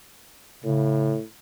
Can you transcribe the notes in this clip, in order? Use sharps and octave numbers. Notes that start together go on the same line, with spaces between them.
A2 C#3